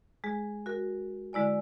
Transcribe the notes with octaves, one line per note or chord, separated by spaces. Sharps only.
G#3 G#4
F#4 A#4
D3 G#3 E4 D5 G#5